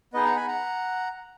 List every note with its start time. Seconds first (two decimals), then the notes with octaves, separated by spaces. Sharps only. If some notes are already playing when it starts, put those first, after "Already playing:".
0.13 B3 D#4 G#4 B4 D#5
0.25 F#5 A#5
0.36 G#5 B5
0.47 F#5 A#5